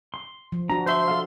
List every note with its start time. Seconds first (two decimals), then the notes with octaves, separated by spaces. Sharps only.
0.14 C6
0.52 F3
0.70 D4 F#4 A#5
0.86 C5 E5 C6 C#6
1.08 A4 E5 F5